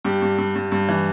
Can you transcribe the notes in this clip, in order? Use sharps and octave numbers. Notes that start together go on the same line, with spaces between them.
G2 G4
G2
G2
G2
G2
E3